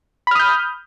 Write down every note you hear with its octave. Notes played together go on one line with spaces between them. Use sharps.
B5 D#6 F6 G6